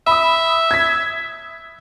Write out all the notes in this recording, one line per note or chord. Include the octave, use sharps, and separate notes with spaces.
E5 B5 D#6
G#6 B6